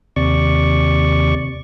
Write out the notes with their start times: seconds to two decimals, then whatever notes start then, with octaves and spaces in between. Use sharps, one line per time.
0.16 D#2 C3 D5 C#6